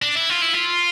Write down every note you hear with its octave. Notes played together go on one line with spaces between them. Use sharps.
D4
E4
F4
E4
F4